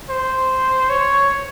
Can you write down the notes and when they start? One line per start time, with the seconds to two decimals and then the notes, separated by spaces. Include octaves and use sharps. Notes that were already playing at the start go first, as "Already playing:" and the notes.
0.10 C5
0.90 C#5